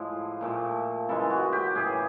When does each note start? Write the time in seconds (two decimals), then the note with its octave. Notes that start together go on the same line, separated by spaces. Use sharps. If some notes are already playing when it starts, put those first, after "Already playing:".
Already playing: A2 F3 G#3
0.41 A#2 F3 A3
1.08 C#3 E3 G#3 A4
1.30 F#4
1.53 G4
1.75 A2 E3 A3 G#4